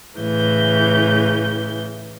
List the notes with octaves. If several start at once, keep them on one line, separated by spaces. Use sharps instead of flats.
A2 C#3 E3 G6